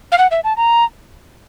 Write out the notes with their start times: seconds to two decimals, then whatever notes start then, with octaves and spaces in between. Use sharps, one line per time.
0.12 F5
0.18 F#5
0.31 E5
0.44 A5
0.57 A#5